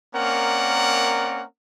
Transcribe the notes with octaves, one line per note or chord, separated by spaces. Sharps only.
A#3 C4 C#4 A#4 D5 F#5